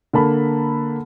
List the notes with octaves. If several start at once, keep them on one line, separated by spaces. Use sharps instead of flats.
D3 A#3 A#4 A5 B5